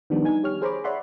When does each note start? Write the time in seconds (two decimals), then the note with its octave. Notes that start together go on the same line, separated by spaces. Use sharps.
0.10 D#3 F3 G3 B3 D4
0.24 D#4 G#5 G#6
0.43 G4 C#5 F6
0.62 G#4 C5 C#5 A#5 B5 D6
0.84 C#5 D5 E5 F#5 B5 C6